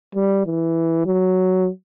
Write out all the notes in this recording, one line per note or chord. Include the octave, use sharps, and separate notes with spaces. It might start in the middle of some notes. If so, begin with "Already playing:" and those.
G3
E3
F#3